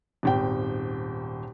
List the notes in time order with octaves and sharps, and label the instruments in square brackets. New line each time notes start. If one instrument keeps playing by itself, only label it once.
[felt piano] D#1 G#1 G5